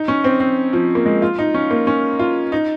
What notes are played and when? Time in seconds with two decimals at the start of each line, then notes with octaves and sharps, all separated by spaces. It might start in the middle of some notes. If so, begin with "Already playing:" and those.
Already playing: D#4
0.08 C#4
0.24 C4
0.40 C4
0.73 F3
0.95 A#3
1.06 G#3
1.22 F4
1.39 D#4
1.54 C#4
1.71 A#3
1.87 C#4
2.19 F4
2.52 D#4